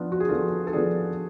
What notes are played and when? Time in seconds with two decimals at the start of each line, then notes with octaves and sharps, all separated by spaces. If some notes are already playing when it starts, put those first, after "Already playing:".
Already playing: F3 B3 D4 F4
0.12 F#4
0.20 G#4
0.29 F3 B3 D4 F4 A4
0.67 A4
0.73 F3 B3 D4 F4 G#4